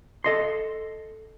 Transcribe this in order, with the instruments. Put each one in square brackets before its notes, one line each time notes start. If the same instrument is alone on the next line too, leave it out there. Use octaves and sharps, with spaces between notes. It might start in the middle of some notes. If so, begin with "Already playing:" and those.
[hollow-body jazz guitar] A4 D#5 C6